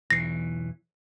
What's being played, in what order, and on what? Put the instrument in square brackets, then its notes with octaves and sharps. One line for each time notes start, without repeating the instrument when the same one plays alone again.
[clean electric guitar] B1 E2 E3 [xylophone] A#6 C7